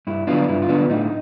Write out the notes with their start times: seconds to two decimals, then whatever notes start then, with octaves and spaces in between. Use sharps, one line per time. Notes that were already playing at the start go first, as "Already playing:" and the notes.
0.07 G2 E4
0.27 D3 F#3 B3 D4 F4
0.48 G2 E4
0.62 F4
0.69 D3 F#3 B3 D4
0.90 A2 D#4